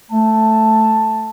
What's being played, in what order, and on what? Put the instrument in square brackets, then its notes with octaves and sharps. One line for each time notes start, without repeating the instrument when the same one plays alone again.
[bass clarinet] A3 [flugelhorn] A5